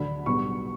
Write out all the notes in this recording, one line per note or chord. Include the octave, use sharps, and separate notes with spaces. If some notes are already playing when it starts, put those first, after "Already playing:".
Already playing: D2 D3 F#3 B5
B1 B2 G3 B3 C#6